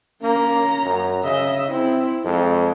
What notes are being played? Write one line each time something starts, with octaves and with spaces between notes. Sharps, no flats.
A#3 C#4 A#5
F#2
C#3 D#5 E5
C4 E4
F2 G#3